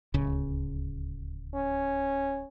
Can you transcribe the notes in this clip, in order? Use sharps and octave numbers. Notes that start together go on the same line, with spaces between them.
D1 C#2 C#3
C#4